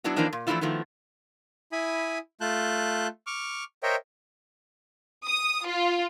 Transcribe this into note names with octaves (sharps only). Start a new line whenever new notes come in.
F#3 B3 D4 E4 F#4
E3 F3 A#3 C4 D4 D#4
A#2
E3 F3 A3 D4 E4 F4
D#3 F3 A3 B3 E4
E4 G#5 B5 D#6
A3 F4 A5 F#6 G6
C#6 D6 F6
A#4 C5 C#5 D#5 E5 G5
D#6
F4